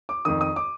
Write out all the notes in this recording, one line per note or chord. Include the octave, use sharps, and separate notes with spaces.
D6
F2 D#3 D#6
D#6
D6